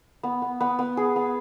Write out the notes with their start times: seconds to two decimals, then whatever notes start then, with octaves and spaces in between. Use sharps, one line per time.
0.23 B3
0.42 B3
0.60 B3
0.79 B3
0.97 G#4
1.16 B3